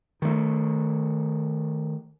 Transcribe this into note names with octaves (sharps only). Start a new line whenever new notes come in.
D#3 A3